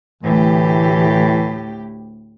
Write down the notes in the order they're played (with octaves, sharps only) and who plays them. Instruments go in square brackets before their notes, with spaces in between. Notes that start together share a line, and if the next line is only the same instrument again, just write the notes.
[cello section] D2 G4 [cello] A2 [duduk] E3